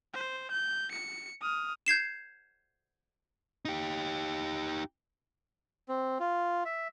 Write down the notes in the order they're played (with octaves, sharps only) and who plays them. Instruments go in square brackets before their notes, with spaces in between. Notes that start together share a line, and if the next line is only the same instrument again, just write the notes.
[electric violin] C5
G6
C#7
D#6 F6
[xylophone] G6 G#6 C7 E7
[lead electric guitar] D#4 G4
[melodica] C4
F4
E5